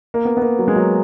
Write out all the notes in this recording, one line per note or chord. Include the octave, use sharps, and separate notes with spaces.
A#3
B3
B3
A#3
F#3
G#3
F#3